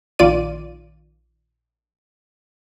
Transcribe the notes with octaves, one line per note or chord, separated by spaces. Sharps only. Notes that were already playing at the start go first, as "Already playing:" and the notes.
A#1 D#3 F4 D5 D#7